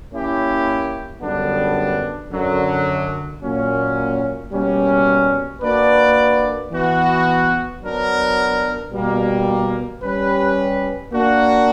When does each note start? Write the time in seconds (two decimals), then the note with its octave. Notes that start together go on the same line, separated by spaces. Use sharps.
0.11 A#3 C#4 E4 G4
1.20 F#2 D3 G3 B3 D4
2.31 F#2 D3 F#3
3.41 A#2 F#3 A#3 C#4
4.51 B2 G3 A#3 C#4
5.61 A#3 D4 F#4 B4 D5
6.71 E3 B3 F#4
7.81 F#3 B3 D4 A#4
8.91 B2 G3 A#3
10.02 G3 C#4 G4 B4
11.12 A#3 D4 F#4